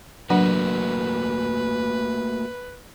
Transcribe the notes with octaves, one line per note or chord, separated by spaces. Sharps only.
F#3 A3 A#3 D4 F#4 B4 F#5